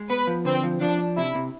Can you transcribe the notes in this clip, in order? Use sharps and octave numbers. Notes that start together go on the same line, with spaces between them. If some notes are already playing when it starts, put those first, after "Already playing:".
Already playing: G#3
B3 B4
F3
D3 C4
F3
F3 D4
D4
C3 E4
C3